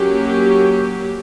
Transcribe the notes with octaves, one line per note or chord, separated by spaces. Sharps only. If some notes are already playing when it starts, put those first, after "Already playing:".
Already playing: F#3 A#3 C#4 G4